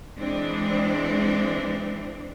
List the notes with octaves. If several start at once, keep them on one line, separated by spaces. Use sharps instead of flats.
E3 G#3 C4 D4